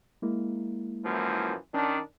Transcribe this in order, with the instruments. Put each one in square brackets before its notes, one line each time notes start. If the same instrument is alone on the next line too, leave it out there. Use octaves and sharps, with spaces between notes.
[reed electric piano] G#3 A#3 E4
[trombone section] F#2 E3 F3
[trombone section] D#3 D4 [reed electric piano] C#4